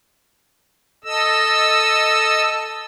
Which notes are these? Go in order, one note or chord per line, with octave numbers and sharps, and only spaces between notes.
A4 D#5 E6